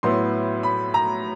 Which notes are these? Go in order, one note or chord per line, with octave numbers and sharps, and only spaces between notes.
A2 F#3 B3 E4 C6
B5
A#5